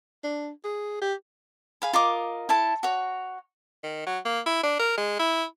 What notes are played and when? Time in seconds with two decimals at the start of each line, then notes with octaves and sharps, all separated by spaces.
0.24 D4
0.64 G#4
1.01 G4
1.82 G#4 F5 B5
1.93 F4 A#4 D#5 D6
2.49 E4 A4 A5
2.83 F#4 C#5
3.84 D#3
4.07 F#3
4.26 A#3
4.46 E4
4.64 D4
4.79 A#4
4.98 G#3
5.19 E4